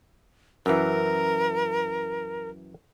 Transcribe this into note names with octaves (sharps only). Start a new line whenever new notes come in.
F#2 E3 A#4